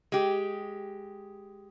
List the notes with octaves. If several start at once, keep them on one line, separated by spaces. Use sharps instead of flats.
G#3 G4